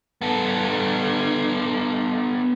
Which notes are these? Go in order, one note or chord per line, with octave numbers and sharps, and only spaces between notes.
B3 A4